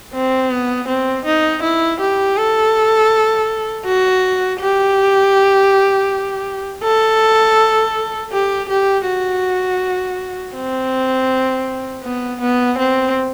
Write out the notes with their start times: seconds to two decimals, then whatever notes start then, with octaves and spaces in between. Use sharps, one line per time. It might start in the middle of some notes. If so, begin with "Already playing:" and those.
0.14 C4
0.51 B3
0.88 C4
1.25 D#4
1.62 E4
2.00 G4
2.37 A4
3.86 F#4
4.60 G4
6.83 A4
8.32 G4
8.69 G4
9.06 F#4
10.55 C4
12.04 B3
12.41 B3
12.78 C4